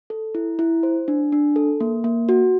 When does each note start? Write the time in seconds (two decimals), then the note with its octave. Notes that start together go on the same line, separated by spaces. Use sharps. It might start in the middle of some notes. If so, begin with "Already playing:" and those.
0.10 A4
0.35 E4
0.59 E4
0.83 C5
1.08 D4
1.32 D4
1.56 A4
1.81 A#3
2.04 A#3
2.29 F#4